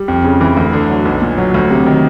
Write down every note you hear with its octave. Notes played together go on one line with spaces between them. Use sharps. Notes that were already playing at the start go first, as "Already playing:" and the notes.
Already playing: G3
F2
C#3
E3
D2
D3
F#3
B1
A#2
F#3
D2
C3
D#3